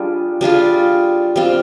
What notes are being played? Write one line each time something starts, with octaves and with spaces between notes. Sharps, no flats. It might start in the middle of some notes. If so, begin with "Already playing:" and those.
Already playing: G3 D4 F4 G#4
G3 D4 F4 G#4
G3 C4 F4